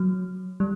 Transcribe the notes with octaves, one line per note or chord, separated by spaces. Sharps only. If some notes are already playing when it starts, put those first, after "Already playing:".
Already playing: F#3
G3